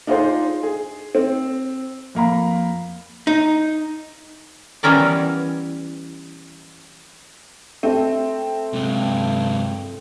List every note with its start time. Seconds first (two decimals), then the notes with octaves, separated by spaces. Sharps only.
0.07 D4 D#4 F4 G#4 C5 C6
0.63 G#4
1.15 C4
2.15 F2 A#3 A#5 B5
3.27 D#4
4.83 E3 G3 B3 C#4 A#4 D5
7.83 A3 C4
8.73 G2 C3 G#3